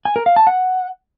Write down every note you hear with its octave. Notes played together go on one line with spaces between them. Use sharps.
G#5
A#4
F5
A5
F#5